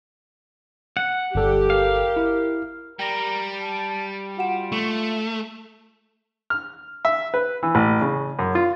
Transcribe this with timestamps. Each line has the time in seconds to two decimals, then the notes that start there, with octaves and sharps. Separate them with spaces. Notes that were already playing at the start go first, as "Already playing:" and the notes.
0.97 F#5
1.35 G1 G3 G4 A4
1.70 A#4 F5
2.17 E4
2.99 G3 A#4 G5 A#6
3.60 A5
4.37 F4 F#4 F#5 E7
4.72 A3 C#6
6.50 F6
7.05 E5
7.34 B4
7.63 E3
7.75 A1
8.01 C#3
8.39 F#2
8.55 F4